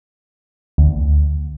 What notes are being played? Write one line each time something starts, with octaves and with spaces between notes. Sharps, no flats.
D2